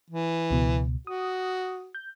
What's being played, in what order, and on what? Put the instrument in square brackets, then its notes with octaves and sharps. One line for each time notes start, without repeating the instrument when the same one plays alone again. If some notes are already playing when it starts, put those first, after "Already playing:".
[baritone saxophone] E3
[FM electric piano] C#2 B2
[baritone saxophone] F#4 [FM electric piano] D#6
[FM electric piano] G6